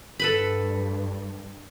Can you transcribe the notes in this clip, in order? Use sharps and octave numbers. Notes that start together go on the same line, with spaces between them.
G2 A4 B4 B5